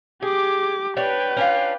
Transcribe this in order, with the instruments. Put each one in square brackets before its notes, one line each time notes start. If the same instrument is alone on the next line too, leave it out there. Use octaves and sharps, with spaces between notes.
[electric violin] G4 D6 [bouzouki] G#4
[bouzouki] D4 G4 C#5 [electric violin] B4 G5
[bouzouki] C#4 D4 F4